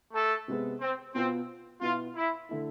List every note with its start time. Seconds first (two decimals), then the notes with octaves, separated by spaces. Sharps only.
0.13 A3 A4
0.48 C3 G#3 B3
0.81 C4
1.15 B2 B3 C4 F4
1.81 B2 B3 E4 F4
2.16 E4
2.49 D3 A3 E4